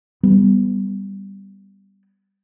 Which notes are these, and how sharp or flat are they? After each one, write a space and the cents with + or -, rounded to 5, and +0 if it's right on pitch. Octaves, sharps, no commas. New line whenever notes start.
G3 +0 B3 +0